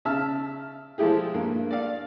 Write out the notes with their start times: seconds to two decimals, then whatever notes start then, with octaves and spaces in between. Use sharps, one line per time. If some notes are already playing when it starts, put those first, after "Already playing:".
0.05 C#3 E5 A5 E6 F6
0.98 F3 G#3 A3 E4 G4 G#4
1.34 G2 A#3
1.71 D5 F5